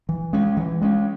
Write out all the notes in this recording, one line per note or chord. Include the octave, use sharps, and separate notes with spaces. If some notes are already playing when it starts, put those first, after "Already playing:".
E3
G#3 C#4
E3
G#3 C#4